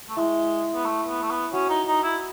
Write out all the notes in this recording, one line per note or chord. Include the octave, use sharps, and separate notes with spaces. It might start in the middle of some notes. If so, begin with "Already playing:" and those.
A3
G#3 E4 E5
B3
A3
B3
A3
B3
C#4 F#4 F#5
D#4
D#4
E4